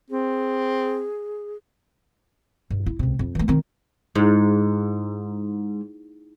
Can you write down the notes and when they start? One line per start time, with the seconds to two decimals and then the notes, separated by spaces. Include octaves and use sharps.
0.10 C4 G#4
2.70 G2
2.86 E4
2.99 C#2 C3
3.19 F2
3.35 E3 A3
3.48 D#3 C4
4.15 G#2 D#4 E4 G#4